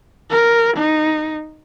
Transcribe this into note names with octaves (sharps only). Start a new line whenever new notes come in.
A#4
D#4